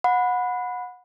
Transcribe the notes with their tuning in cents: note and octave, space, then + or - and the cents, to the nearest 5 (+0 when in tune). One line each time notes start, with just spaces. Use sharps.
F#5 -25 B5 +0